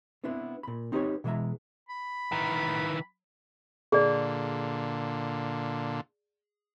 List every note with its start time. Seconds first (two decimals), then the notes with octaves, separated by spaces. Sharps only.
0.24 B3 C4 D4 E4 B4
0.63 A#2 B5
0.92 C4 D#4 G4 A4 B4 C#5
1.24 B2 E3 G#3 G#4 E5 A#5
1.89 B5
2.32 D#3 E3
3.92 A#2 D3 G#4 D5